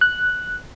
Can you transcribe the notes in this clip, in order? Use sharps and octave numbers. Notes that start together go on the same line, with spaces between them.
F#6